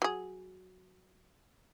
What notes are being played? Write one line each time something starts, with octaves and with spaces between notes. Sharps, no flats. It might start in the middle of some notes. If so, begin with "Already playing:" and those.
F#3 G#4